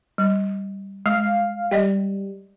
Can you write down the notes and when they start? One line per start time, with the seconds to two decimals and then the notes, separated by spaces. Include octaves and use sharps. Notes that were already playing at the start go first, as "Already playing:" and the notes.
0.18 G3
1.06 G#3 F5
1.71 G3 D5 D#5 G5